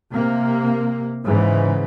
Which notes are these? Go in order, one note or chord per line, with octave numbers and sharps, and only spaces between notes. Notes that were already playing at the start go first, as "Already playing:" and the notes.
C3 A#3
G#2 C#3 E3